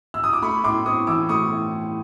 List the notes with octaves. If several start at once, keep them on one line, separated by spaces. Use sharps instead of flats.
E6
D#6
D6
A3 B5 C#6
A2 C6 D6
C4 C#6 D#6
E3 D6 E6
A3 C#6 D#6
A2